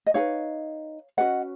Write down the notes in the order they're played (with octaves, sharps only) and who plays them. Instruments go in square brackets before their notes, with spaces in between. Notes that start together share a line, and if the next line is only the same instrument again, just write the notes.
[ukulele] D#5
D#4 G#4 B4 C#5 F5
C#4 F#4 B4 D#5 F#5